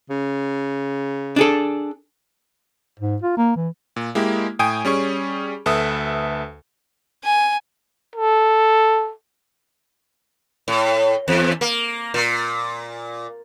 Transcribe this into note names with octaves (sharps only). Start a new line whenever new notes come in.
C#3
D4 G#4 A4
G#2
F4
A#3
E3
A#2
G#3 A#3 E4 G4
A2 G5 G#5 D#6 D7
G3 C#4 G#4 C#6
D2 A4 B4 E5 D#6
G#5
A4
A2
E2
A#3
A#2